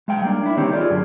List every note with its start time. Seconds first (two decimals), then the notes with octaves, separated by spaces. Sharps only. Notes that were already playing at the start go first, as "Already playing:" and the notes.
0.08 G#3 F5 G5
0.22 G3 A#3 D4
0.43 D4 E4
0.57 D2 D#3 A#3 C4 G4 C#5
0.73 F4 G#4 D5
0.90 F#2 D3